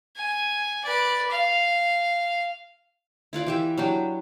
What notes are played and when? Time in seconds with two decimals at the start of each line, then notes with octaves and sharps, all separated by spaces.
0.16 G#5
0.84 B4 D5
1.31 F5
3.33 E4 F4 B4 D5
3.46 E3 G4 E5
3.78 F#3 D4 G4